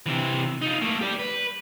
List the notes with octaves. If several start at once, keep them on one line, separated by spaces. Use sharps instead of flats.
C3 E3
D#4 F4
A3 A#3
G4 D5
B4